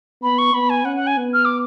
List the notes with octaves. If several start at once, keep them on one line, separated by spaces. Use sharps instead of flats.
B3 B5
C#6
B3 B5
G#5
C#4 F#5
F#5
G#5
B3
F6
D6